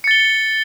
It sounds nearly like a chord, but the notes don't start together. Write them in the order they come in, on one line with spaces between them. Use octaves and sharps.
C#7 A6 G7